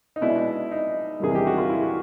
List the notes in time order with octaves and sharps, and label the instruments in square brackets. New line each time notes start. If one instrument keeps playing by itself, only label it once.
[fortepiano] D#4
B2 G#3 B3 D4 E4
D#4
E2 C3 D#3 G3 G#4
G4
F#4
F4
E4
F#4